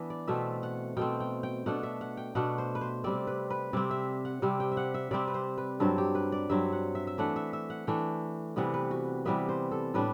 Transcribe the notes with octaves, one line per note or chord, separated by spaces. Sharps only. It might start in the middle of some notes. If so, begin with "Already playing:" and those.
Already playing: E3 B3 D4 E5
D5
B2 A3 C4 E5
F#5
B2 A3 C4 G5
G5
G5
B2 A3 D4 F#5
E5
F#5
G5
B2 A3 D4 F#5
C5
B4
C5
C3 G3 C4 D5
B4
B4
C3 G3 C4 D5
E5
F#5
C3 G3 C4
G5
E5
F#5
E5
C3 G3 C4 D5
B4
C5
B4
G2 F#3 C4 A4
G4
B4
D5
G2 F#3 C4 E5
F#5
E5
E5
E3 A3 D4 F#5
E5
E5
F#5
E3 A3 D4 G5
C3 E3 G3 B3 F#5
B4
F#4
C3 E3 G3 B3 E5
C5
A4
A2 G3 D4 B4